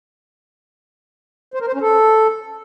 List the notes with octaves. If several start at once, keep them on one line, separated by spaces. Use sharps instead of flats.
C5
A#4
C5
C#4
A4